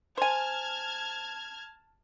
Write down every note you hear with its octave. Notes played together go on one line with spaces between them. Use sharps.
C5 G#5 A5 F6 G#6